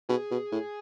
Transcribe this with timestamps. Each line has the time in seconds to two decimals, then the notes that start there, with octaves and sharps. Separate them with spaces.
0.09 B2 G#4
0.31 B2
0.52 A2